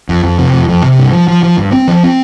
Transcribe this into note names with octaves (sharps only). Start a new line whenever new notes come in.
F2
F2
C3
F2
F2
C3
G2
F3
F3
F3
G2
C4
F3
C4